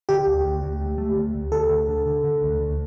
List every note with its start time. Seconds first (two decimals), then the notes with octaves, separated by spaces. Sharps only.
0.09 D3 G4
0.27 D2
0.44 D2
0.63 D2
0.81 A3
0.98 A3
1.17 D2
1.34 D2
1.52 D2 A4
1.70 D2
1.88 D3
2.07 D3
2.24 D3
2.43 D2
2.61 D2